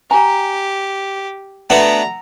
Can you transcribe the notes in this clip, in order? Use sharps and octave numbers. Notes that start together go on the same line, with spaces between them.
G4 G#5 A#5
A3 B3 D4 F#4 F#5 A#5